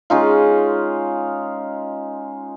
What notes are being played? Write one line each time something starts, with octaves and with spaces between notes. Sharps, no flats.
G#3 C#4 D#4 F4